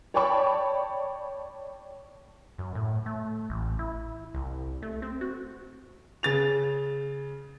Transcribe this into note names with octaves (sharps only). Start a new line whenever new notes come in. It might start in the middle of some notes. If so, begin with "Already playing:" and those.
C#5 D5 G5 A5 B5 C#6
F#2
A2
A3
A1
E4
C2
A3
C4
F#4
C#3 A6 F7